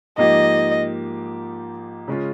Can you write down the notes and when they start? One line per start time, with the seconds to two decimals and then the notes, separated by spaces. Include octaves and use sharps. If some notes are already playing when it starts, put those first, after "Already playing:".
0.18 G#2 F3 A#3 D#4 G4 D#5
2.08 C#3 G#3 C#4 F4